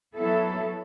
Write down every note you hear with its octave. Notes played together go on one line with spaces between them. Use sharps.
F#3 B3 E4 A4